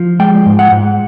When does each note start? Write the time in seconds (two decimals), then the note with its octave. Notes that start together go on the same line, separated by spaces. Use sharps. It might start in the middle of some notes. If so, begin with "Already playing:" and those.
Already playing: F3
0.20 G#3 G5
0.46 G#2
0.59 F#5
0.72 G#2